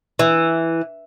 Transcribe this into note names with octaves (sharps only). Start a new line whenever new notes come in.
E3